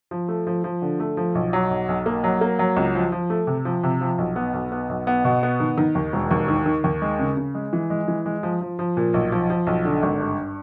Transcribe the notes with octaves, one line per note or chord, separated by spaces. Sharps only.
F3
A3
F3
F3
D3
A3
F3
B1
F#3
B1
B1
A#3
F#3
A#3
F#3
C#2
F3
F3
A3
C3
F3
C3
F3
B1
B3
B1
B3
B1
B3
B2
B3
D#3
D#3
D#2
E1
D#2
D#3
D#3
D#2
G#3
C#3
C#3
G#3
E3
G#3
E3
G#3
F3
F3
F3
A#2
B1
F3
F3
B1
D3
G#1
G2